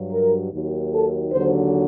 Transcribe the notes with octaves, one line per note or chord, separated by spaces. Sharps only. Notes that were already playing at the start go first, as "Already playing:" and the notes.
Already playing: G2 F#3
A#4
D#2 D#3 F#3
A4
D#2 D3 F#3 C5